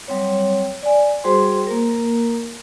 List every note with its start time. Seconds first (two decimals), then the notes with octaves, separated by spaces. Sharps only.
0.08 F#3 G3 C4 C#5
0.83 D5 G#5
1.24 G3 F#4 G#4 C5 C6
1.67 A#3 A#4